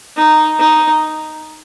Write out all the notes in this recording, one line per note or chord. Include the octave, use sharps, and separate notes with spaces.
D#4
D#4